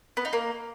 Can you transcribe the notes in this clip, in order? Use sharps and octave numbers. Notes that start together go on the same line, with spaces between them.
B3
D#4
A#3